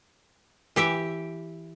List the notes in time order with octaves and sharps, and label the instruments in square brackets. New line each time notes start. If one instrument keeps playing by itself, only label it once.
[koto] E3 G4 E5 G5